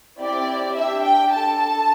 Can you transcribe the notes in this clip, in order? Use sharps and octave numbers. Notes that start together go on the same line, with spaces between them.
C4 E4 G4 D5
D4 G4 E5
G5
D4 A4 A5
A5